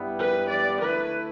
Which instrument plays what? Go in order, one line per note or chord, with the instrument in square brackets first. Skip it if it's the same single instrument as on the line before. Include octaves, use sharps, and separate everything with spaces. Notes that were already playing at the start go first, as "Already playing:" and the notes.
Already playing: [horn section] G2 G3 B3 E4
[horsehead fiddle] B4
D5
[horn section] D3 A3 E4 [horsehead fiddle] B4